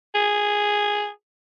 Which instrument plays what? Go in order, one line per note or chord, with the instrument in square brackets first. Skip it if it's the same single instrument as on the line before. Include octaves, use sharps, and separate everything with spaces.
[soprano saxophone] G#4